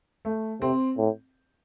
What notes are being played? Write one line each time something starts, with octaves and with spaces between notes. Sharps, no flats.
A3
C3 C4
A2